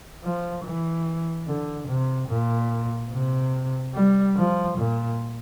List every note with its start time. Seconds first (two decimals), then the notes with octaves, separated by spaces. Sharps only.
0.23 F3
0.64 E3
1.47 D3
1.88 C3
2.29 A#2
3.11 C3
3.95 G3
4.37 F3
4.78 A#2